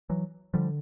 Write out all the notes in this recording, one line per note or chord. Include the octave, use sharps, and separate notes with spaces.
E3 F#3
D3 F3 G3